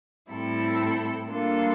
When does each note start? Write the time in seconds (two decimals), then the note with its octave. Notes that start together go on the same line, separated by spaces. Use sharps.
0.30 A2 G3 C4 E4 A4
1.28 G3 A#3 D4 F4 A4